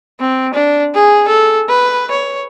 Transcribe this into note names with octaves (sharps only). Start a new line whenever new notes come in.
C4
D4
G#4
A4
B4
C#5